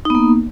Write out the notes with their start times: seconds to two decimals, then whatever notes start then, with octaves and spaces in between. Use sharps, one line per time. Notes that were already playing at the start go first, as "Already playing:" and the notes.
0.05 D#4
0.10 B3
0.15 A#3